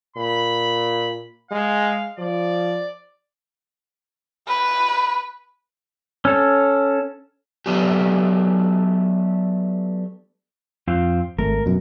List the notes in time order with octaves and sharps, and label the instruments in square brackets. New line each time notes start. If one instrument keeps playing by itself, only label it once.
[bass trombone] A#2 [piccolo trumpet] B5
[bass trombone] G#3 [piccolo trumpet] F5
[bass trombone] F3 [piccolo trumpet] D5
[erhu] B4
[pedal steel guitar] C#4 A4
[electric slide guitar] F#3 A3 B3 D4 F4 G4
F2 C4 F4
[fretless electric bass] G#1 A3 [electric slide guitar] A#4
[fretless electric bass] F#2 B2